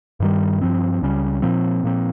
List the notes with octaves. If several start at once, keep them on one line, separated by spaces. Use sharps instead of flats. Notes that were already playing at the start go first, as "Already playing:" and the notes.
G2 D#3 G3
G2 F3 C4
C#2 C#3 G3 C#4
A#2 F3 C4
A#2 F3 C4